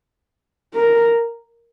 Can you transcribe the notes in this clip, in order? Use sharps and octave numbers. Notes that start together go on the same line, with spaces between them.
A#4